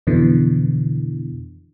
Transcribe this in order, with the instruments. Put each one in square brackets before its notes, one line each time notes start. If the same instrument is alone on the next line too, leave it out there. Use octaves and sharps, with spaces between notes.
[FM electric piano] F2 B2 D3 E3